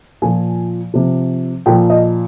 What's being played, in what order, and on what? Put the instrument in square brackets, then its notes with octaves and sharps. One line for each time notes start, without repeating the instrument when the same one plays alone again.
[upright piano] A#2 F3 G#5
C3 F3
A#2 F3 G5
D#5